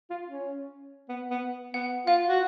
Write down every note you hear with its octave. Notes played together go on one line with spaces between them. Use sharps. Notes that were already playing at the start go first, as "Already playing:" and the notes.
F4
C#4
B3
B3
B3 F#5
F4 F5
F#4